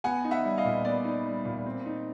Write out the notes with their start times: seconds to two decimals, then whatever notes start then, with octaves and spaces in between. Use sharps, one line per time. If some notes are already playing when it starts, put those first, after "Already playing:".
0.04 B3 F#5 G#5
0.24 D#4
0.31 E5 F#5
0.45 G3
0.58 D#5 F5
0.65 A#2
0.85 B3 D5
1.04 D#4
1.25 G3
1.45 A#2
1.66 C4
1.86 D#4